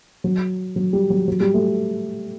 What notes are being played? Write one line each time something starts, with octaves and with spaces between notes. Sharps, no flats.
F#3
F#3
G3
F#3
F#3
G3
A3